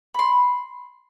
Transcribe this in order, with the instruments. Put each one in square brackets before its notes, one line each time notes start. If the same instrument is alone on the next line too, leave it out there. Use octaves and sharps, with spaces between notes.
[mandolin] B5 C6